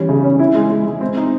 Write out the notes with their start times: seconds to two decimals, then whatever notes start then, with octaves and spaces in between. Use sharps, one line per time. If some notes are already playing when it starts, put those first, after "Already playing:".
Already playing: E3 G3 C#4
0.09 C#3
0.24 C#4
0.39 E4
0.55 G#3
0.70 G#3
0.86 G#3
1.01 C4
1.17 D#4